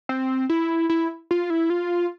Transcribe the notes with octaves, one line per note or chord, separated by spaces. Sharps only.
C4
E4
E4
F4
E4
F4